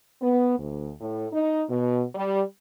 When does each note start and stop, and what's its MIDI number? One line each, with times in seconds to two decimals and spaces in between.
0.22 0.56 59
0.58 0.91 38
1.00 1.26 45
1.32 1.63 63
1.68 2.02 47
2.15 2.42 55